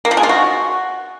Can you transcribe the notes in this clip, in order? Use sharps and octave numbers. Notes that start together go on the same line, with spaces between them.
A#3
F3
G#3
F4
F#4